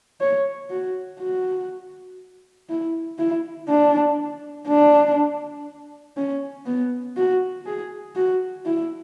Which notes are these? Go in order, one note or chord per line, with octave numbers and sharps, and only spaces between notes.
C#5
F#4
F#4
E4
E4
D4
D4
C#4
B3
F#4
G#4
F#4
E4